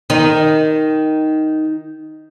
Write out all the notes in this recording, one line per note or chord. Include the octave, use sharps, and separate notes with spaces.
D#3 D#4